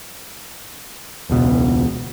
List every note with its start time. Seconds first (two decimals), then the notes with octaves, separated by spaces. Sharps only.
1.29 E1 C#2 B2